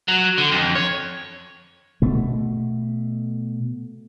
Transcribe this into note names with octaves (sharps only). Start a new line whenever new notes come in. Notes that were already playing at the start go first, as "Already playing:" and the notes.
F#3
D3
F2
C#5
B2 A3